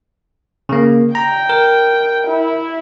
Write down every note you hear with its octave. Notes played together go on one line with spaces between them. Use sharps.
C#3 A#3
G5 A#5
A#4
E4